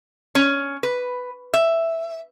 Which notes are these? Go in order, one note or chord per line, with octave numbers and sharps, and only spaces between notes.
C#4
B4
E5